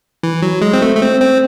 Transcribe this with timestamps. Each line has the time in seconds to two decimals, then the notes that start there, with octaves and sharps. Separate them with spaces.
0.23 E3
0.42 F#3
0.62 G#3
0.73 C4
0.82 A3
0.96 A3
1.02 C4
1.20 C4